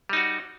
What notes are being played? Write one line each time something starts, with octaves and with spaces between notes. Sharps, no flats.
G3 D#4 F#4